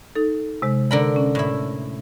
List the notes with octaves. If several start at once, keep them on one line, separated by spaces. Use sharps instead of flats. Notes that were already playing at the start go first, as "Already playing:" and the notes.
D#4 A4
C3 G#3
D3 A#4 D5 B5
C#4
A2 E4